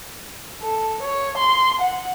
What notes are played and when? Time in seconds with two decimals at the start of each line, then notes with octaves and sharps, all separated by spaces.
0.62 A4
1.02 C#5
1.37 C6
1.81 F#5